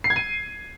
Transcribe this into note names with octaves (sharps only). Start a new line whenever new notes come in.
C7
G#6
D#7